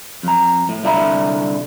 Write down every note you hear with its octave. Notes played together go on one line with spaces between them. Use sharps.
F2 A#5
A2
C2 D3 E4 E5 A#5 B5